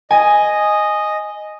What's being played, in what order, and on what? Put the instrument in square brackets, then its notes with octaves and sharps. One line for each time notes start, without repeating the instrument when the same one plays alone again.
[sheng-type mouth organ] D#5 [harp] G#5